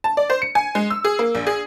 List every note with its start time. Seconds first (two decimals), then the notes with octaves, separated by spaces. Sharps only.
0.04 A5
0.17 D5
0.30 C5
0.42 C#7
0.55 G#5
0.75 G#3
0.90 E6
1.05 G#4
1.19 A#3
1.35 A#1
1.47 G#4